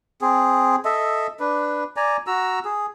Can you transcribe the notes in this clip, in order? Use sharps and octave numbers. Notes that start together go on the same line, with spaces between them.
C4 G#4
A4 D#5 E5
D4 B4
D5 G#5 A#5
F#4 A#5 E6
G#4